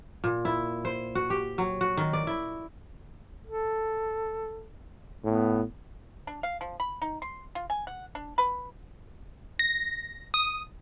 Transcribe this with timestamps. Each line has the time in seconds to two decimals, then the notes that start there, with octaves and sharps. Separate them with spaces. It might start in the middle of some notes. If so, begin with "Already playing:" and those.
0.24 A#2
0.45 E4
0.85 C5
1.15 F#4
1.30 G4
1.58 F#3
1.81 F#4
1.97 D#3
2.13 D5
2.27 E4
3.47 A4
5.24 A2 B3
6.27 D4
6.43 F5
6.61 F3
6.80 B5
7.02 D#4
7.22 C6
7.55 F4
7.70 G#5
7.87 F#5
8.15 D4
8.38 B4
9.59 A#6
10.34 D#6